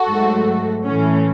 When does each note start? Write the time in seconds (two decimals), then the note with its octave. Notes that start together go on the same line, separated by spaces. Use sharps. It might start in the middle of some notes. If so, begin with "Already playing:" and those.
Already playing: F#4 A4
0.09 G#2 F#3 A3
0.84 A2 E3 A3 C#4